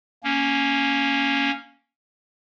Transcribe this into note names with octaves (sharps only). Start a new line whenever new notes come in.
A#3 C#4